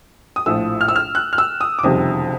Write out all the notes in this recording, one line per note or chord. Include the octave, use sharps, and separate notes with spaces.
D#6
A#1 A2 F3 E6
F6
E6
F6
F#6
F6
E6
D#6
D6
F#1 F2 C3 D#3 G3 D#6